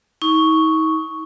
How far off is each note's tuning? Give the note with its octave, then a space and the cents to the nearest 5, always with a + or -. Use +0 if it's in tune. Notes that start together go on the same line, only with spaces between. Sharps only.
D#4 +40 C#6 +0